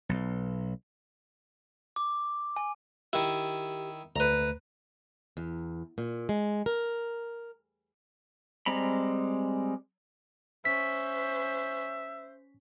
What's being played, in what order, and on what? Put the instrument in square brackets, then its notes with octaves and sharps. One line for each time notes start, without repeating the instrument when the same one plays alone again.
[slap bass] B1
[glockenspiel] D6
G#5
[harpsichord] D#3 E4 [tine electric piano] G4
[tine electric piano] D2 A3 [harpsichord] B4 A#5
[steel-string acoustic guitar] E2
A#2
G#3
A#4
[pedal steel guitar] G3 G#3 C4 A#5 B5
[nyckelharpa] C#4 [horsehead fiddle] C5 [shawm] E5 [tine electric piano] B6